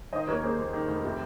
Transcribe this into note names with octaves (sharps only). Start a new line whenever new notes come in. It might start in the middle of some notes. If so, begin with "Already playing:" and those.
D#3 C5 D#5
D#2 A#4 C#5
A#3 G#4 C5
D#2
D#3
F1
C3